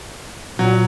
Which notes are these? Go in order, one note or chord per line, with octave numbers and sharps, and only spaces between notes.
A#2 F#3